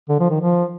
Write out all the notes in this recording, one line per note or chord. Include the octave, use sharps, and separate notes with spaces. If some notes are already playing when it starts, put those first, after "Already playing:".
D3
F3
D#3
F3